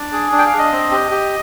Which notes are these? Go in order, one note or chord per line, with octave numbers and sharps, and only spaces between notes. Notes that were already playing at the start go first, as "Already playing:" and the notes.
Already playing: D4 D5
G#4
D4
G5
F5
D4
D#5
C4
G4
G4